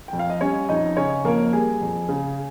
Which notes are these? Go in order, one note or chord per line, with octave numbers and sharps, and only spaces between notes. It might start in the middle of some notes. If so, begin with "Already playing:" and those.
F2 G5
F5
D#5
G3 C#4 C#5
F2 D#4 D#5
C#3 C#4 C#5
F2 A#3 A#4
G3 G#4
F2
C#3